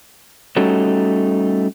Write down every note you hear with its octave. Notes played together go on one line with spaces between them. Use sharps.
G3 A3 C#4 D#4 F#4 A4